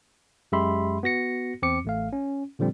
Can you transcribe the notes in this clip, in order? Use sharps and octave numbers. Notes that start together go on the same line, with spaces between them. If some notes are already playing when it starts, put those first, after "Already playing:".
F#2 G#3 G4 E5 B5 C6
B3 F#4 A#6 C#7
E2 C4 D6 C#7
A1 A3 F5
C#4
A#2 D3 F3 G3 C4